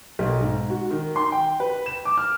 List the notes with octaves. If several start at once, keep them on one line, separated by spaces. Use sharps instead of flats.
B1
G#2
F#4
D#3
C6
G5
B4
E7
D6
F6